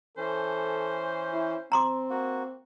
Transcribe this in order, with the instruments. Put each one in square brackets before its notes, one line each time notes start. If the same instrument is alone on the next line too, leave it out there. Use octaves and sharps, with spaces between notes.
[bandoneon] E3 C#4 [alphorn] A4 [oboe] C5
[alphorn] E4
[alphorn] C4 [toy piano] A#5 C6 D6
[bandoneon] A#3 F#4